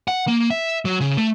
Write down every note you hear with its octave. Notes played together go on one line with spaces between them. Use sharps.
F#5
A#3
E5
F#3
C#3
A3